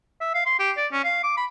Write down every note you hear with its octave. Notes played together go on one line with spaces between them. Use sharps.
E5
F5
C6
G4
D5
C#4
F5
D6
B5